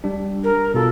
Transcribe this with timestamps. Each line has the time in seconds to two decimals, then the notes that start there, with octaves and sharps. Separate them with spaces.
0.04 G3 D4
0.43 A#4
0.74 B2 F4 A4